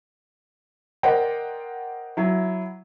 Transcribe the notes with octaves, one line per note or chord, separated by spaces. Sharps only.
A#4 C5 D5 D#5 F#5 G5
F#3 E4